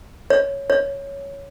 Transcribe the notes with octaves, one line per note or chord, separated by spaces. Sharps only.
C#5
C#5